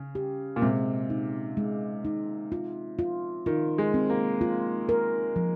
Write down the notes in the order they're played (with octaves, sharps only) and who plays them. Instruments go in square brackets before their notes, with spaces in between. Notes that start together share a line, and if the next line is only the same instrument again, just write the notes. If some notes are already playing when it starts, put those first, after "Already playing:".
Already playing: [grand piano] C#3 [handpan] C#4
[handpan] G4
[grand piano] A#2
[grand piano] C3 [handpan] G#3
[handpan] D#4
G#3
D#4
F4
F4
[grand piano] D#3 [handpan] F4
[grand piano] G#3
[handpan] C4
[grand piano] A#3
[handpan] F4
A#4
F3